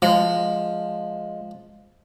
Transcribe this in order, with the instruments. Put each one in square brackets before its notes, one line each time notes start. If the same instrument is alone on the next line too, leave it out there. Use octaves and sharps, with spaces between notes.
[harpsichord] F3 [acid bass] G#3